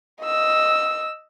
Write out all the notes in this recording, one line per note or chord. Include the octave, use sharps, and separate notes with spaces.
D#5 E6